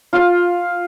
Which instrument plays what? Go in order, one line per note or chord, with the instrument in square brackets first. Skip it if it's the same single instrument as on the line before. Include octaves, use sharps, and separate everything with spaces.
[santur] F4 F5